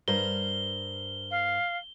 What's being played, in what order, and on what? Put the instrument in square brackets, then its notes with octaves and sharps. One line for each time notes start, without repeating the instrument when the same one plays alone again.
[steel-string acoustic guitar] G2 A#4 C5 [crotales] G7
[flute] F5